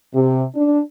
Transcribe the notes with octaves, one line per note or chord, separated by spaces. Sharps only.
C3
D4